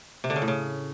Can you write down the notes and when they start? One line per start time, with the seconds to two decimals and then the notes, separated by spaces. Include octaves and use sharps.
0.24 C3
0.30 D3
0.36 C#3
0.42 A2
0.48 C#3